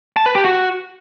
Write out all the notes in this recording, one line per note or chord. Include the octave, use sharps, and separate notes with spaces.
A5
B4
G4
F#4